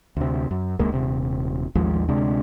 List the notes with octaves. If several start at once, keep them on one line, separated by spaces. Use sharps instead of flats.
D2 C3
F#2
D#1 C#2 G#3 A#3
D#1 C3
A1 D#2 F3 G#3
D2 C3 G#3 D4